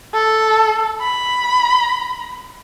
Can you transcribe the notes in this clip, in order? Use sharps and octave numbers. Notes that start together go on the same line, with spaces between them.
A4
B5